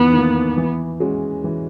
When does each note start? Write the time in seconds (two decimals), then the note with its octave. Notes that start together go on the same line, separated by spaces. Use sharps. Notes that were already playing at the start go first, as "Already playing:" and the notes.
Already playing: E2 D#3 B3
0.13 D#3 A#3
0.57 E3
1.00 G#3 C#4 F#4
1.44 E3